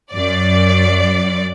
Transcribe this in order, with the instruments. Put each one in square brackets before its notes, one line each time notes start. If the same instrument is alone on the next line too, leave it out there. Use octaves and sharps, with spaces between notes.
[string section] F#2 D5